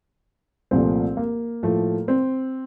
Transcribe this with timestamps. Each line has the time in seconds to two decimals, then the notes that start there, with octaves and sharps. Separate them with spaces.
0.71 C2 A#2 F3 A3 C4
1.17 A#3
1.63 A2 F3 A3
2.08 C4